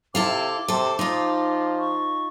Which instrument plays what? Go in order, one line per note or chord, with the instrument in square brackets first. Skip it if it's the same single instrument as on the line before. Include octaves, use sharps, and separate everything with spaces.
[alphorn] C3 [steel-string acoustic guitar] E4 A4 F5 [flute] D6
[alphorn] C3 [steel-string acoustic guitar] A4 C5
[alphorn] F3 [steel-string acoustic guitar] D#4 F4
[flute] C#6